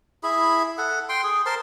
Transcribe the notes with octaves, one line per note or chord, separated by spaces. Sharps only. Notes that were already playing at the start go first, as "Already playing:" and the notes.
E4 G#4 B5
A4 F#5
G5 C6
G#4
A#4 C5 A5 C6